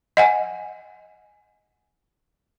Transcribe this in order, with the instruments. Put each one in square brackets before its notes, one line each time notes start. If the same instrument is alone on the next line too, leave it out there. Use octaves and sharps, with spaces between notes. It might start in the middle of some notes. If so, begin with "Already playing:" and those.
[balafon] D#5 F#5 G#5